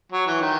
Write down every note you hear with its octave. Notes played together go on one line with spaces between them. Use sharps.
F#3
E3
D#3